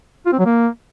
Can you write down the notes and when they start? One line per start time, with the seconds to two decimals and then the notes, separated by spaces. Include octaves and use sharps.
0.26 F4
0.33 C4
0.39 F#3
0.46 A#3